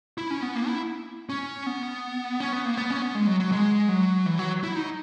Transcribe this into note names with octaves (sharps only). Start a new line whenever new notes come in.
E4
C#4
B3
A#3
E4
C#4
B3
C#4
B3
A#3
B3
C#4
B3
G#3
F#3
F#3
G#3
F#3
E3
F#3
E4
D#4